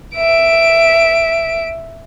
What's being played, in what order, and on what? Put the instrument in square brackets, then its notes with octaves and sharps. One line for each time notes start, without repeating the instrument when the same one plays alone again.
[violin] E5 D7